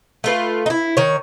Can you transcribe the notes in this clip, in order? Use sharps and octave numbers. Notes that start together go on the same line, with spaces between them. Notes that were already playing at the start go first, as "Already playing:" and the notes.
A3 F4 B4
D#4 E4
D#3 C#5